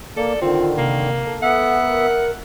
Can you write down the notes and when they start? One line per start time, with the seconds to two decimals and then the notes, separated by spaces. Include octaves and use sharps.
0.17 A#3 A4 D5
0.42 D3 D#3 C4 F4
0.78 C3 A#3
1.27 A4
1.43 B3 E5 F#5
1.83 A#4